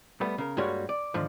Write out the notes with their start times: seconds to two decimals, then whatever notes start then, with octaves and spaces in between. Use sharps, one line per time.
0.21 G3 A3 B3
0.38 C#3 A#4
0.57 G2 G3 G#3 A#3 F#4 C#5
0.89 D5
1.14 G#2 D3 D#3 F3